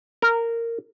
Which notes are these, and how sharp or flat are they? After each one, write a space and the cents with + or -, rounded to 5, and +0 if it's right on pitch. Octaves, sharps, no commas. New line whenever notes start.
A#4 -15